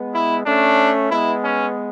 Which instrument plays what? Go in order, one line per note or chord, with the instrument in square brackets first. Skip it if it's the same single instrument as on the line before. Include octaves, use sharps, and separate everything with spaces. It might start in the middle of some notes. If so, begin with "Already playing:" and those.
Already playing: [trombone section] G#3 B3
[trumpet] E4
[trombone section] A3 C#4 [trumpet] D4
[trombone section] G#3 B3 [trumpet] E4
[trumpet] C#4